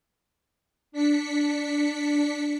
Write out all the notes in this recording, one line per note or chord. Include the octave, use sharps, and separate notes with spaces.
D4 B6 C#7